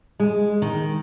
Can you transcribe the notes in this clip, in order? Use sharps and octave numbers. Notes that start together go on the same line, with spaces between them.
G#3
D#3